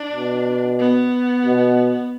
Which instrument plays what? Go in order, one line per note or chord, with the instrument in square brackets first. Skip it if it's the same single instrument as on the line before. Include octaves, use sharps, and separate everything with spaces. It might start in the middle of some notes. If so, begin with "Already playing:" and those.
Already playing: [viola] D4
[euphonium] B2
[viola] B3
[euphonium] B2